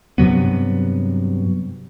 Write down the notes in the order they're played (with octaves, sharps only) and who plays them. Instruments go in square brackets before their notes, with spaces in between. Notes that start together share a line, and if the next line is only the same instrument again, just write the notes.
[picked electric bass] G2 C3 F#3 B3